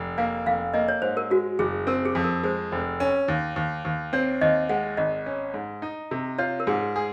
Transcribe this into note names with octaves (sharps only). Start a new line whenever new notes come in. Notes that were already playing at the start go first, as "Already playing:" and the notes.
Already playing: F1
A#3 F5
F1 F5
A#3 D#5
C#5
G#2 C5
A#4
G#3 F#4
F#1 G#4
C4 A#4
G#4
F2
A#4
G#3 C5
F1 C5
C#4
D#2
D#2
D#2
C4 C#5
D#2 D#5
G#3 F#5
G#1 D#5
C#4
G#2
D#4
C3
F4 C#5
A#4
G#2 G#4
G#4